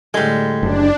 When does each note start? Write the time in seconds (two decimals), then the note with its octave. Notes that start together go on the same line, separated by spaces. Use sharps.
0.14 A2 D3 G3 G#3
0.63 F#1 D4